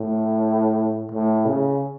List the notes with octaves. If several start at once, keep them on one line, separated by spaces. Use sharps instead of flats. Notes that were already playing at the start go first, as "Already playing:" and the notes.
Already playing: A2
A2
C#3